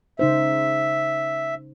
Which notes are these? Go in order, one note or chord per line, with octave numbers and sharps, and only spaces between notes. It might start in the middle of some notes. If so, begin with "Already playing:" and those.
C#3 D#4 C5 E5